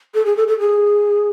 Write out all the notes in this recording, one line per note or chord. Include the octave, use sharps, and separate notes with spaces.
A4
G#4
A4
A4
G#4